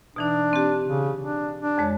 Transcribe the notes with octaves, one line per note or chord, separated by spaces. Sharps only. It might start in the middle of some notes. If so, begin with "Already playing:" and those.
B2 E3 D4 D#4
C4 G4
C#3
D4
D4
F2 G#3 C#5